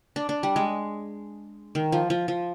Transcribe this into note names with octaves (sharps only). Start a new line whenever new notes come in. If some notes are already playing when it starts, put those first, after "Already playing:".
D4
D4
G3
G#3
D#3
F3
F3
F3